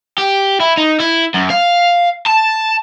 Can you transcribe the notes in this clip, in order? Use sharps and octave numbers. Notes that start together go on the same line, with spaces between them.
G4
E4
D#4
E4
F#2
F5
A5